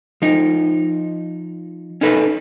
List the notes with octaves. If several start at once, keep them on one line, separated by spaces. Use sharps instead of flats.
F3 D#4
C#4 D#4 A4 B4